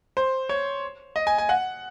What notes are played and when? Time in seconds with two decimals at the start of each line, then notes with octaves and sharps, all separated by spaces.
0.17 C5
0.49 C#5
1.16 D#5
1.27 G#5
1.38 G#5
1.49 F#5